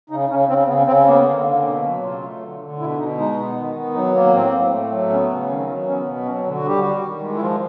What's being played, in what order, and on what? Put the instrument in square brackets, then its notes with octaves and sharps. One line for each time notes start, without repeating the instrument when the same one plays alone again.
[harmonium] C#3 D#4
C#3 C#4
C#3 C4
C#3 B3
C#3 C4
A#3 B3
D3
A#3
B2 C4
F#3 C#4
C#3 F4
A3
D3
D3
B2 E4
B2 D#4
G#3 D#4
B3
D#3
B3
F#3 D#4
A#3 B3
A2 C4
A2
A3
F#3
B3 C#4
C#3
D#3 C#4
C4
F#3 B3
B3 C#4
B2
F#3 C#4
C4
D3
F#4
G3 G4
G3 F#4
D#3
G#3
E4
F3 F4